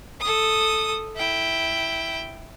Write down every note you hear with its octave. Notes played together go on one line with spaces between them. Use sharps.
A4 D#6
E4 G5